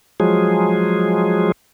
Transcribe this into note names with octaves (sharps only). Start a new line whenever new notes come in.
F3 F#3 G#3 G#4